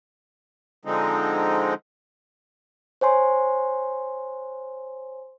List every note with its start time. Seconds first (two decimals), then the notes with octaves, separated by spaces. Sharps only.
0.85 D3 F3 G#3 C4 D#4
3.01 C5 C#5 G#5 C6